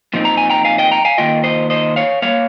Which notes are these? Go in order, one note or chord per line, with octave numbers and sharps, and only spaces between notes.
A#2 F3 C4 D#4
A#5
G#5
G5 A#5
F5 G#5
D#5 G5
G5 A#5
F5 G#5
D#3 A#3 F4 D#5 G5
C5 D#5
C5 D#5
C#5 F5
G3 A#3 C#5 F5